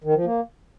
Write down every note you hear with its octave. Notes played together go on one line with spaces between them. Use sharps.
D#3
F3
A#3